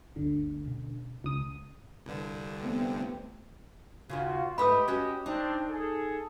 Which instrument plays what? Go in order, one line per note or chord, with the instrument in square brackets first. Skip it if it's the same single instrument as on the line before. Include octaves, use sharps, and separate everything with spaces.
[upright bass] G1 D2 [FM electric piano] D3
[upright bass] B2 C#4
[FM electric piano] C#2 D#6 [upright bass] D4
[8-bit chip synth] C2 G2 D3
[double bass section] A3 B3 C4
[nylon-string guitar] D#2 A#2 C#3 [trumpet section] F4 F#4
[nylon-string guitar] G#2 A3 B4 [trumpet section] G4 D#5 [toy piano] B5 D#6
[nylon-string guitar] C#4 F#4
[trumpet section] C4 D4 [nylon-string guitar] D#4
[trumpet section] G#4 A4